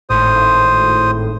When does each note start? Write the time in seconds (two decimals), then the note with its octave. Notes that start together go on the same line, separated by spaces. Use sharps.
0.10 G#1 A2 C5 D#6